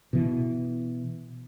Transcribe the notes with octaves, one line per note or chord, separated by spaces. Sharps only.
B2 E3